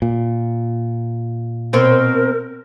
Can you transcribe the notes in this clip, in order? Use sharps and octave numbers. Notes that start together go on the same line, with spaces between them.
A#2
B2 C4 A#4 C#5